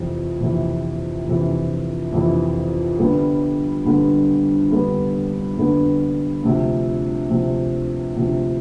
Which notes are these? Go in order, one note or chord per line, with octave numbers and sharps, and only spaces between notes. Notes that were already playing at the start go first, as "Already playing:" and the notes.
Already playing: F2 C3 E3
F2 C3 E3
F2 C3 E3
F2 C3 E3
G2 D3 G3 B3
G2 D3 G3 B3
G2 D3 G3 B3
G2 D3 G3 B3
D2 C3 F3
D2 C3 F3
D2 C3 F3